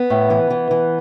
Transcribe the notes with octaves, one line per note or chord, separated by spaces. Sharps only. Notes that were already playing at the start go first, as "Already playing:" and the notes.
Already playing: B3
A2
E3
E3
E3